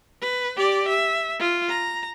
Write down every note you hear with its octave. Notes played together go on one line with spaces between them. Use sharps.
B4
G4 D5
E5
F4
A#5